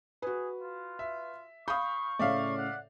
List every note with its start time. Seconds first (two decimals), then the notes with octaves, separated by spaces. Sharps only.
0.22 F#4 G#4 B4
0.62 F4
0.99 E5
1.68 F5 B5 C#6 D#6 G6
2.19 A2 C#3 A4 D5 E5 F5
2.58 F#5